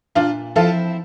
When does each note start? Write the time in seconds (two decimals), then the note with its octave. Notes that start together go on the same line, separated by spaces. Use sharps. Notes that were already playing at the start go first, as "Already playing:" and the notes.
0.15 A#2 D4 F4
0.56 F3 C4 E4 F4 A4